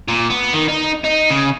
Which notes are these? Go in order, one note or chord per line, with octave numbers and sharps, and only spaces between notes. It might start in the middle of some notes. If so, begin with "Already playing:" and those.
A#2
B3
D#3
D#4
D#4
C#3